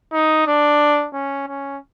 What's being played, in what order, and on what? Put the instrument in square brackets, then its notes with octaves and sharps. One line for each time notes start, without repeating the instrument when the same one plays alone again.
[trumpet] D#4
D4
C#4
C#4